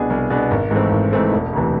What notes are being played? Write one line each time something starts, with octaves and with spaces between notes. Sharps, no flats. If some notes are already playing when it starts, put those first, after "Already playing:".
Already playing: C2 B2 B3 D4 G#4
C2
B2 B3 D4 G#4
G#1
G#2 E3 A3 C4
G#1
G#2 E3 A3 C4
E1
D2 C3 E3